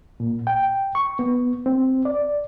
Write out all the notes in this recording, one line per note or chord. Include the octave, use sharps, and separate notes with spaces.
A#2
G5
C#6
B3
C4
D5